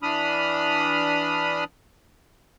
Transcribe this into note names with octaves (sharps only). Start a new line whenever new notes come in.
E3 D4 B5 D#6 F6